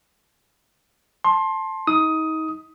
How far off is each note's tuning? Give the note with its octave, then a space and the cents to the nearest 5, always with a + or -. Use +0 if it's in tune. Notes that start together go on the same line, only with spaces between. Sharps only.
A5 +0 C6 +20
D#4 +30 D#6 +15